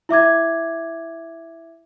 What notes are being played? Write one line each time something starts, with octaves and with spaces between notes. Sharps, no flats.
E4 E5 D6 G#6